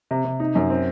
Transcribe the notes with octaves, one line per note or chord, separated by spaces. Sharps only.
C3
C3
D#4
F#2
C4